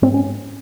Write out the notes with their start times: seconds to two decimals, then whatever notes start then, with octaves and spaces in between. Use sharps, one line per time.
0.02 G#2 C4
0.14 C#4